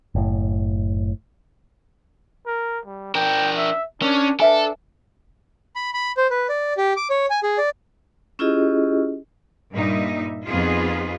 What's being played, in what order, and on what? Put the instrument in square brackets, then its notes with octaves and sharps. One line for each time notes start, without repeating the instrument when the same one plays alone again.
[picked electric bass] F#1 A2
[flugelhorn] A#4
G3
[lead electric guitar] D4 A#4 [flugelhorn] G5
[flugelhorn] E5
[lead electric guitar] C#4 [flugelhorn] D4 [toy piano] A#4
[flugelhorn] D4 [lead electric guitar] A4 [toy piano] B4 E5 G#5
[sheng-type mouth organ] B5
B5
C5
B4
D5
G4
D6
C#5
G#5
G#4
D5
[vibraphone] C#4 E4 F4 G4 G#4 D#5
[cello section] G2 A#2 G3 D#4 E5
F2 B3 D#4 F4 G#4